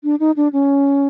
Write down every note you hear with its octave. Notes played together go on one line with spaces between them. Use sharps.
D4
D#4
D4
C#4